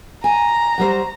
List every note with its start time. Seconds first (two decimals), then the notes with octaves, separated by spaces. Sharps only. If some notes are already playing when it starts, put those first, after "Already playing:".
0.24 G#5 A#5
0.78 F#3 G3 C5